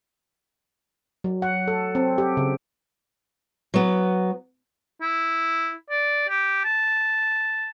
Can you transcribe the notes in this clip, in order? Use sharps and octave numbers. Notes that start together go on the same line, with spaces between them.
F#3
F#5
A4
C4
G4
C#3
F#3 B3
E4
D5
G4
A5